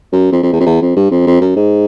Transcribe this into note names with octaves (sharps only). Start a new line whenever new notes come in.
F#2
F2
F2
E2
F2
E2
F2
G2
F2
F2
F#2
G#2